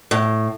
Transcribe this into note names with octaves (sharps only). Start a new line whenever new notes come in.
A2